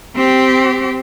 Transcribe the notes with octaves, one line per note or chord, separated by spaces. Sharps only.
C4 G4